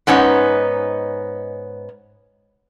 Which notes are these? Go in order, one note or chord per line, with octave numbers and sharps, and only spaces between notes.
G#2 B3 C#4 D#4